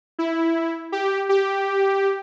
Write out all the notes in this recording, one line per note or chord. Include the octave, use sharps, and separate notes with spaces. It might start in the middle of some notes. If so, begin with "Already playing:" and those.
E4
G4
G4